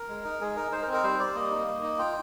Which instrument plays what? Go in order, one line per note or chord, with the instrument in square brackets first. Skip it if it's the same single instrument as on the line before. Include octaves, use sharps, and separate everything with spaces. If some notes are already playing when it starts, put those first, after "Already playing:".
Already playing: [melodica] A#4
G#3
D#4
G#3 G#4
D#4 A#4
D#4 C5
A#4
C4
A#4
G3 C5
G3 D5
A#3 D#5
D#4
A#3
D#4
F4 G5